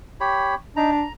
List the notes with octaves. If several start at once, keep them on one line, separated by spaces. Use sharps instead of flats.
G4 C#5 B5
D4 D#4 A#5
A#5